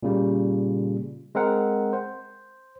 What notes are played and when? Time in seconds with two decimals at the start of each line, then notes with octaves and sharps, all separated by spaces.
0.03 A#2 C#3 G3
1.35 G#3 C4 A#4 F#5
1.93 C5